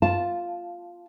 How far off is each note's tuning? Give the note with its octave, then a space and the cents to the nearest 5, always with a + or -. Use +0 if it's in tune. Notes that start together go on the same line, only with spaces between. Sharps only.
F4 +0 A5 +0